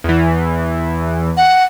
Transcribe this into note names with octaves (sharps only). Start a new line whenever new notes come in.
E2 E3
F#5